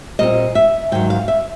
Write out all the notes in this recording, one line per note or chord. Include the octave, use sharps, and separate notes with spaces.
A#2 G3 C4 D#5
E5
G#2 D#3 F#3 G5
F5
E5